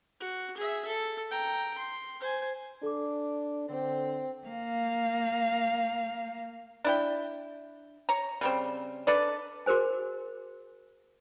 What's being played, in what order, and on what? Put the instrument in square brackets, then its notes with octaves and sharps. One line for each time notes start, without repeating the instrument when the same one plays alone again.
[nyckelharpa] F#4
G#4 E5
A4
G5 A#5
C6
C5 G#5
[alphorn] D4 [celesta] A4 D6
[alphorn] D3 [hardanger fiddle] C4
[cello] A#3 F5
[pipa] D4 E4 G5
C#5 A#5
C#3 G3 C4
D4 A4 B4 D5
[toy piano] F#4 G#4 A#4 C5 G#5